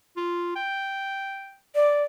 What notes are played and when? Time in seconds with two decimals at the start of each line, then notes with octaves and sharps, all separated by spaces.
0.17 F4
0.55 G5
1.75 D5